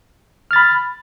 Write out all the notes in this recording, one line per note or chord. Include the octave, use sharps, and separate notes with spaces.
B5 F6 A6